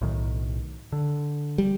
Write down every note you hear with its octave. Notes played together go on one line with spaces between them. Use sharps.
B1 A2 D#3
D3
G3